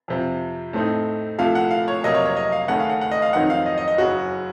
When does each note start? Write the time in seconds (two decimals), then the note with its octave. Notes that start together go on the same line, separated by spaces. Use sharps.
0.08 F2 C3 F3
0.73 A2 A3 C4 D#4
1.38 C2 A#2 F3 A3 F5
1.55 F#5
1.71 F5
1.88 C#5
2.03 F2 C3 F#3 A#3 D#5
2.15 C#5
2.26 C#5
2.37 D#5
2.52 F5
2.68 D#2 C#3 A3 C#4 F#5
2.80 F5
2.90 F#5
3.01 F#5
3.11 D#5
3.22 F5
3.33 F2 D#3 F#3 C4 D#4 F#5
3.50 F5
3.66 D#5
3.78 D#5
3.88 D#5
3.98 F#1 F#2 C#3 F#3 F#4